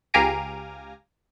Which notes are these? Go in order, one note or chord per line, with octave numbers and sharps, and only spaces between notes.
C#2 G4 F5 G#5 A#5 D7